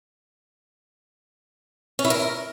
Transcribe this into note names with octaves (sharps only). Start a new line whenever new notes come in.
C#4
E4
A#4